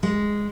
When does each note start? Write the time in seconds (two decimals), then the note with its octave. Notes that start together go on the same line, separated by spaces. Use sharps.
0.03 G#3